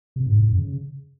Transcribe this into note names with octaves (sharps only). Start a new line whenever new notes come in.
C3
G#2
A2
F#2
C#3